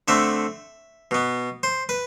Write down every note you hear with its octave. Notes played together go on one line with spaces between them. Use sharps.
D3 A3 C4 E5
B2 B3
C5
B4